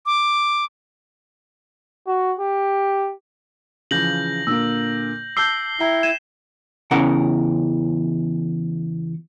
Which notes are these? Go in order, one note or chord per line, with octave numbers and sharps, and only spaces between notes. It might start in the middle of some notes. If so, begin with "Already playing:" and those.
D6
F#4
G4
C#3 E3 F3 G6 A#6 F#7
A#2 D3 A#3 E6
A5 D6 E6 G6 C7 G7
E4 G5 A#5
G#6 D#7 E7
E2 C#3 E3 A#4 F#5